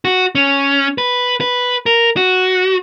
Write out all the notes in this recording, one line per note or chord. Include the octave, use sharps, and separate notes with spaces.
F#4
C#4
B4
B4
A#4
F#4